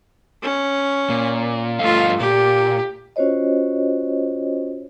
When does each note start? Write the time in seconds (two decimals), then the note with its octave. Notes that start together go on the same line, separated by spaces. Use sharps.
0.42 C#4
1.10 A#2
1.79 G2 A3 F4 D#5 F5
2.20 A#2 G4
3.16 C#4 F4 F#4 C5 C#5 D#5